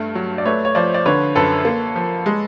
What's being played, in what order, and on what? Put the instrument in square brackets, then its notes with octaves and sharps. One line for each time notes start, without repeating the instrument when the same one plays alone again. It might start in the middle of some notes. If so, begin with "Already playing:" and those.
Already playing: [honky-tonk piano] G2 A3
F#3
[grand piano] D5
[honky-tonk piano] A3 [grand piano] B4 C#5
[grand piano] C#5
[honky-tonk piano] F3 [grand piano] C5 D5
[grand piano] D5
[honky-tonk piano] D3 [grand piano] B4 C#5
[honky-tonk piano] F#2 [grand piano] A4 B4
[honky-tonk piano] A#3
F3
G#3